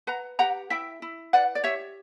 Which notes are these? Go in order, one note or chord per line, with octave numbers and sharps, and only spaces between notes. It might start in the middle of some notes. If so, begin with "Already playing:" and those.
B4 F#5 A#5
G4 F#5 A#5
E4 E5 G5
E4
B4 D5 F#5
D5
G4 C#5 E5